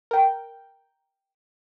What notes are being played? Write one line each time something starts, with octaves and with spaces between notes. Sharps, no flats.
A#4 G5